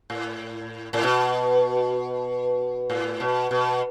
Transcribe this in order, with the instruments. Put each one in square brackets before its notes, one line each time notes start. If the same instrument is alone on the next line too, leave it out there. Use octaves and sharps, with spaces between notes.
[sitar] A2
A2
B2
A2
B2
B2